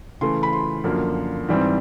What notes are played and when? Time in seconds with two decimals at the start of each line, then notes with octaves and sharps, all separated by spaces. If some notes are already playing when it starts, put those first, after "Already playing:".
0.21 C#3 E3 A3 C6
0.43 B5
0.53 C6
0.84 F#2 D3 F3 A#3
1.48 G#2 E3 G3 C4